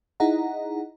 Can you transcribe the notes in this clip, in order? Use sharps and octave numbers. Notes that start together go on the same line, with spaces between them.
D#4 E4 G#4 D#5 F#5 A#5